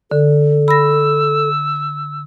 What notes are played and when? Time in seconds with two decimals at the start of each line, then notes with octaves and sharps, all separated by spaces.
0.11 D3 A4
0.68 B5 E6 A#6